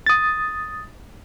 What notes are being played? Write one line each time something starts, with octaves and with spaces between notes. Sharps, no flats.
D#6 A6